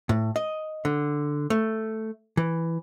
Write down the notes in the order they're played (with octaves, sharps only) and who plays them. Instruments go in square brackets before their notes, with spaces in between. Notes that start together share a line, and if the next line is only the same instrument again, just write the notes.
[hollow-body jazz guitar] A2
D#5
D3
A3
E3